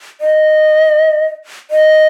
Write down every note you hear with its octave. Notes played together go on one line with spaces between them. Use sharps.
D#5
D#5